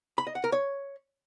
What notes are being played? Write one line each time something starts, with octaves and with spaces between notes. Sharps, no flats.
B5
D#5
F#5
A#4
C#5